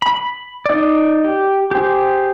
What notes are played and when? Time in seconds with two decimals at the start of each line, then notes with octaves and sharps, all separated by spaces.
0.02 B5
0.66 D#4 D5
1.24 G4
1.71 G4 G#4 C5